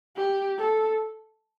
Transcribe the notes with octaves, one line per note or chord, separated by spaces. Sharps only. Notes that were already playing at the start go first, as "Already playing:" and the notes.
G4
A4